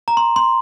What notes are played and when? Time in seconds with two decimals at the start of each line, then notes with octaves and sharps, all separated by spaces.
0.08 A#5
0.17 C6
0.36 C6